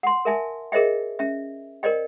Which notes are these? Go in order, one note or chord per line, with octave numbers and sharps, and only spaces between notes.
F#5 C6
A#4 E5 G#5 A5
G#4 A#4 C5 D#5 E5 G5
C#4 E5
A#4 C5 D5 D#5 G5